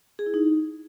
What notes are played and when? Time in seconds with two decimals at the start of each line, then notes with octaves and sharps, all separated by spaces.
0.19 G#4
0.26 E4
0.34 D#4